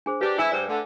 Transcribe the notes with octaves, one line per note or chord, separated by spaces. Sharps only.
D4 G#4 C5
D4 G4 B4
E4 G#5 E6
G2 C5 D5
D3 A3